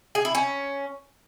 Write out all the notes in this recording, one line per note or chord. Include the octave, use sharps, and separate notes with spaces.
G#4
E4
C#4